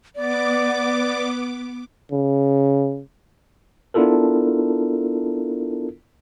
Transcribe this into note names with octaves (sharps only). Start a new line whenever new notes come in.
B3 D5 D6
C#3
B3 D4 E4 F4 A4 A#4